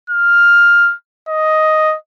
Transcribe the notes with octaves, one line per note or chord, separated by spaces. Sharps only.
F6
D#5